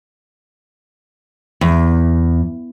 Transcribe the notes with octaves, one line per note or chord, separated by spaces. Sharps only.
E2